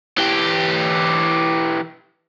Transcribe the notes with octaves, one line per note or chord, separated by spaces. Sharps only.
E3 G4